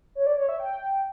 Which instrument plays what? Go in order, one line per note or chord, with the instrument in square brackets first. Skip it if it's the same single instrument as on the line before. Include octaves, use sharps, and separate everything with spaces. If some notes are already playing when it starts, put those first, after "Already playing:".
[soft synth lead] C#5
D5
C#5
E5
G5